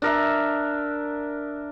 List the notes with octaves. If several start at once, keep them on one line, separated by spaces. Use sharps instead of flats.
D4 A#4 E5